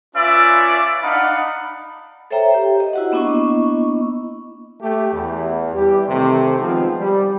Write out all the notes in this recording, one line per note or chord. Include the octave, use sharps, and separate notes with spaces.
C#4 F4 B4 D5 E5
D4 D#4 F5 F#5 B5
A4 C5 C#5 E5 G5 A#5
G4
D#5
E4 F#4 F#5
A#3 B3 D4 E4 D#5 C#6
A3 G4
E2
E3 G3 G4
C3 D#3 A3 C4
D#3 F3 G#3 B3 C4
G3